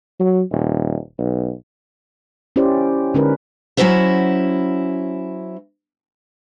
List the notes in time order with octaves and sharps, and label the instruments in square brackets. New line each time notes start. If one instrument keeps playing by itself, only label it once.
[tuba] F#3
D#1
B1
[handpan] C#4 E4 G4 C5 D5
D3 G#3 C#4 D#4 A#4 B4
[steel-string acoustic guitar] F#3 C#4 E4 F#4 C5 E5